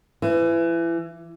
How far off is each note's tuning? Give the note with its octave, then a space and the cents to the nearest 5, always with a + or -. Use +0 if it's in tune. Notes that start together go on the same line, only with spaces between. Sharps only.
E3 +25